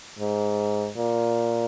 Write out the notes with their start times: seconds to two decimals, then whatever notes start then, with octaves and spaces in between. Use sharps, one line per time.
0.19 G#2
0.97 A#2